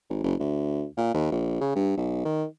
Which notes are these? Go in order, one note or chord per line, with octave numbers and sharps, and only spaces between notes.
G#1
F#1
D2
A#2
D#2
A#1
C#3
G2
B1
D#3